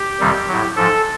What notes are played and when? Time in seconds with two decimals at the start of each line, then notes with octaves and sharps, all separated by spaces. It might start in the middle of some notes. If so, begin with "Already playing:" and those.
Already playing: G4
0.20 F2 C3 D#3 G3
0.48 A2 F#3
0.76 G#2 F3 A4